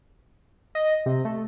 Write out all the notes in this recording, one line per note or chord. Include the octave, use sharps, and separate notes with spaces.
D#5
C3
A3